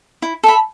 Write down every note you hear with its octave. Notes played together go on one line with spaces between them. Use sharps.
E4
A4 E5 B5